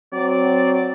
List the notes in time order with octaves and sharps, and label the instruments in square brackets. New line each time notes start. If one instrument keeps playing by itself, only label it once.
[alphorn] F#3 [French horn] C4 [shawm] D5